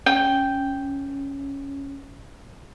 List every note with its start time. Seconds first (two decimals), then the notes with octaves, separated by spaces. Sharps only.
0.06 C#4 G5